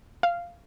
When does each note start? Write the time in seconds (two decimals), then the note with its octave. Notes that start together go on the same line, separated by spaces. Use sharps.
0.23 F5